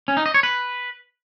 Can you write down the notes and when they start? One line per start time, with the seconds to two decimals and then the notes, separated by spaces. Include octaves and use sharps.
0.08 C#4
0.17 D#4
0.26 D#5
0.34 C#5
0.43 B4